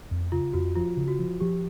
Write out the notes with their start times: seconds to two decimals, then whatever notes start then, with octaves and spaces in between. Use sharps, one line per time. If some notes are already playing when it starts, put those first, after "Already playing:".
0.11 F2
0.32 C#3 F4
0.53 F2 F#4
0.75 F3 F4
0.97 C#3
1.08 F#4
1.19 F3
1.40 F3 G4